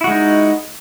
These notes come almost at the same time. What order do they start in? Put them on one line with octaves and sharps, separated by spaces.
E4 F#4 G#3 D#4